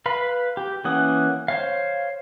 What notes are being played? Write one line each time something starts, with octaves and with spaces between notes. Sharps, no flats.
B4 F5 B5
G4
E3 A#3 C#4 F#5 D#6
C5 C#5 F5